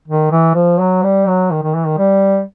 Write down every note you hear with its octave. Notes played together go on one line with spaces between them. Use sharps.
D#3
E3
F3
F#3
G3
F#3
D#3
D#3
E3
D#3
G3